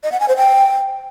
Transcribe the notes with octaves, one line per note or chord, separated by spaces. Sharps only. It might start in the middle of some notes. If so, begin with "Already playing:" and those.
D#5
F#5
G#5
C5
G5